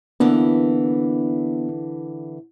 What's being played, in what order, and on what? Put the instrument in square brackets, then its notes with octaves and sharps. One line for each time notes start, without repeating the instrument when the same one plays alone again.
[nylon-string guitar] D3 E3 A#3 [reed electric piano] B3 D4